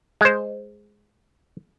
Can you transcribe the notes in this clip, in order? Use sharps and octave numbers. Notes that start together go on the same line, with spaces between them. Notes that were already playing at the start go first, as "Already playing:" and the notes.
G#3 C5